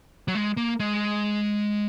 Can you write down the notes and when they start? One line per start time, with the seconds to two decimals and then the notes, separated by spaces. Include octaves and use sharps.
0.28 F#3
0.35 G#3
0.57 A#3
0.80 G#3